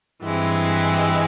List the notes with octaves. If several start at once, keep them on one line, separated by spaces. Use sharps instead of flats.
G2 E3 G#3 C4